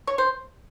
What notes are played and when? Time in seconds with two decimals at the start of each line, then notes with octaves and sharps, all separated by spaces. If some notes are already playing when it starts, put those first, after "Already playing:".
0.07 C#5
0.18 C5